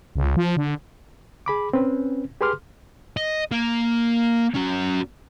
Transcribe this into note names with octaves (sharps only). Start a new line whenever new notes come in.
C#2
F3
D3
G#4 B5 D6
C4 C#4 B4
G4 G#4 B4 C6 D6 F6
D#5
A#3
C#4 F#4